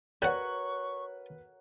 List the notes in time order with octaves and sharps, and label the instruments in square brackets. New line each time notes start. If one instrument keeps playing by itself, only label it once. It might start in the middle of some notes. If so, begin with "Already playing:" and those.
[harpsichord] G3 F#5 [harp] F#4 A#4 C#5 [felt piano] B4 F#6 [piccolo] C#6